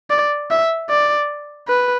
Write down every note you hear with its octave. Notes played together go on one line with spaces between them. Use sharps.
D5
E5
D5
B4